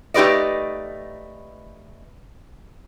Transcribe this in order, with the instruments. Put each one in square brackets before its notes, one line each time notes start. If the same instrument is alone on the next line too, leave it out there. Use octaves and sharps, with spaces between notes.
[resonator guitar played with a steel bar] A3 D#4 G4 B4 D5 D#5